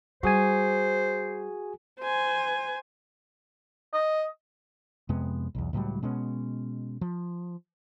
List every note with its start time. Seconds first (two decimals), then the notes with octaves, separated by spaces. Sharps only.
0.23 G3 F#4 G#4 C5 G#5
1.99 C5 G#5
3.93 D#5
5.09 F2 C3 G#3 B3
5.55 B1 E2
5.73 C#2 A2 F#3 G3
6.03 B2 G#3 B3 C#4
7.01 F3